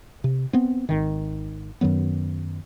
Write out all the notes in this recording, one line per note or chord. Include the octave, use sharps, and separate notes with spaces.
C3
B3 C4
G#1 D#3
F#2 D#3 F#3 B3